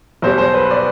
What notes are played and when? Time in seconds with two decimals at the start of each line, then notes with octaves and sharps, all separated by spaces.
0.22 B1 B2 G3 C5
0.38 C5
0.54 B4
0.71 D5